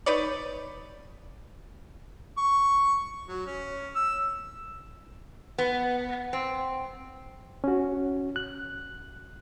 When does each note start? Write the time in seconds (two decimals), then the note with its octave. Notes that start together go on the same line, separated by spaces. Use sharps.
0.06 D#4 B4 C#5 D5
2.38 C#6
3.28 F#3
3.46 C#4
3.95 E6
5.58 B3
6.33 C4
7.64 C#4 F#4
8.36 F#6